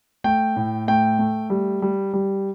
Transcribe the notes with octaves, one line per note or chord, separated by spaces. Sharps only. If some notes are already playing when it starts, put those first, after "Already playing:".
A3 G5
A2
A3 G5
A3
G3
G3
G3